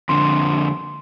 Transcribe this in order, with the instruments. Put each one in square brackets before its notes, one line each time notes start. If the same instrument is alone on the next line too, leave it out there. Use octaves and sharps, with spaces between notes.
[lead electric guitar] F2 D3 [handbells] C6